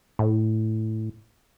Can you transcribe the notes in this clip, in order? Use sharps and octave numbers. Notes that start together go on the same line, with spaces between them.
A2